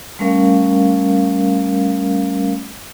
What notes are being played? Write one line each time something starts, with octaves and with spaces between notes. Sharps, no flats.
G3 A3 C#4 A#4 F5